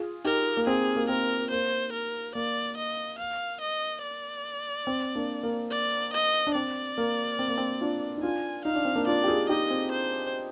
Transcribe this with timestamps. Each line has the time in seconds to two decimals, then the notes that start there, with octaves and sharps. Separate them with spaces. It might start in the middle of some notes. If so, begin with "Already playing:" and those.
Already playing: F4 G#4
0.25 D#4 G4 A#4
0.57 A#3
0.67 C4 G#4
0.97 A#3
1.09 C4 A#4
1.51 A#3 C5
1.93 A#4
2.35 A#3 D5
2.77 D#5
3.19 F5
3.61 D#5
4.03 D5
4.87 C4
5.15 A#3 D4
5.43 A#3
5.71 D5
6.13 D#5
6.47 D4
6.55 C4 D5
6.98 A#3
7.39 C4
7.48 A#3
7.58 C4
7.81 D4 F4
8.17 D#4
8.23 D4 F4 G#5
8.65 D#4 F5
8.75 D4
8.85 C4
8.95 A#3 D4
9.07 D4 F4 D5
9.24 G4
9.28 F4 G#4
9.49 D#4 G4 D#5
9.71 C4
9.92 C5